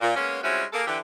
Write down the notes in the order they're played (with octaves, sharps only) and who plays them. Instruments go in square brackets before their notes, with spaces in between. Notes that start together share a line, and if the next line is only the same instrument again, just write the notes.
[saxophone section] A#2
G#3 A#3 B3 C#4
G3 G#3 C4 C#4 E4 F#4
A#3 G#4 A4
D3 E3 G4